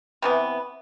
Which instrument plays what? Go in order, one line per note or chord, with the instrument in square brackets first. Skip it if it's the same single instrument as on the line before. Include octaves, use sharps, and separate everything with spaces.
[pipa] C3 E3 B3